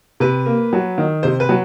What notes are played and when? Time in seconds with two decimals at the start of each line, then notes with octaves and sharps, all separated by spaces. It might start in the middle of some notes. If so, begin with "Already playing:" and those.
0.20 C3 B4
0.46 A#3
0.73 F#3
0.98 D#3
1.23 C3 C5
1.40 B4
1.49 F#3